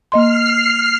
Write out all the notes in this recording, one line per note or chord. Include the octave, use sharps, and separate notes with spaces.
A#3 D#5 C6 F6 C7